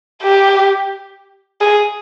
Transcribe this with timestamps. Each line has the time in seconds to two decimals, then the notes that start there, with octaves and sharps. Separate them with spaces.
0.22 G4
1.61 G#4